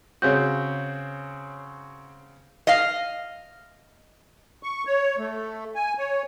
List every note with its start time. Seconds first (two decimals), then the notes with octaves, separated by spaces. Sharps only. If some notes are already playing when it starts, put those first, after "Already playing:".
0.22 C#3 C4 F#4 C#5 G6
2.67 D#5 F5
4.63 C#6
4.87 C#5
5.18 A3
5.76 G#5
5.98 C#5